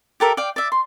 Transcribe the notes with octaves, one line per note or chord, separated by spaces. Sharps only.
G4 A4 A#4 E5
D5 F5 G5
D5 E5
C6